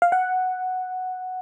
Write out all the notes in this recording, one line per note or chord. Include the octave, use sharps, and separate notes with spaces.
F5
F#5